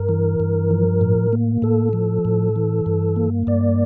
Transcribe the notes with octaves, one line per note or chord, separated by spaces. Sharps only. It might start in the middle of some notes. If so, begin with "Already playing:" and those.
Already playing: G2 A#4
E3
G2
F3
A2
A#3
A2 A4
F3
A2
E3
G2
A#3
G2 D5